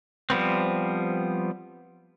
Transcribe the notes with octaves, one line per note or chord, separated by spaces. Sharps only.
F3 G3 B3 C4